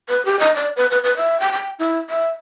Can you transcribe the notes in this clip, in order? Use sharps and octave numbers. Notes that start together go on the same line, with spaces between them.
B4
G4
D#5
D5
B4
B4
B4
E5
G5
G5
E4
E5